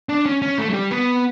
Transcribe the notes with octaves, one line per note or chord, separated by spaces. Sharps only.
D4
C#4
C#4
A3
F#3
G3
B3